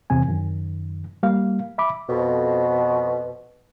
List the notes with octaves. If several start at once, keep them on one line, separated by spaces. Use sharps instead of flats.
E2 C3 C4 G#5
F#2 D#3
G3 A#3 F5
E5 B5 D6
F2 B2